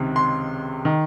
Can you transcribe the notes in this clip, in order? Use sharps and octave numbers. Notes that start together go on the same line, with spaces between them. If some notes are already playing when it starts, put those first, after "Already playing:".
Already playing: C#2 C3 D#3
C6
D#3